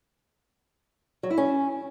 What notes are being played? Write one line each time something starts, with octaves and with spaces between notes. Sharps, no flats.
F#3
E4
C#4